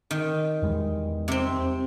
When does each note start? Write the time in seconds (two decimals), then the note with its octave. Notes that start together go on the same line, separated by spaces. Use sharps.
0.11 D#3
0.62 E2 G3 G#3
1.28 C3 C4